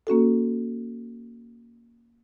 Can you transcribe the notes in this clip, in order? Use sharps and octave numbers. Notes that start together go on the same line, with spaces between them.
A#3 C#4 F#4 A4